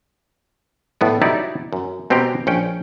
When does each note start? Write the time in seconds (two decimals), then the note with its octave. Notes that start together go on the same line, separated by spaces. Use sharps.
1.01 A2 B3 D5
1.22 F#3 D#4 E4 G4 C5 D5
1.73 F#2
2.10 B2 C4 C#4 G4 G5 A#5
2.47 A#1 C#4 G5